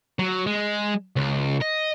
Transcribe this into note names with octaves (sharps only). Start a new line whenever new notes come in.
F#3
G#3
C#2
D#5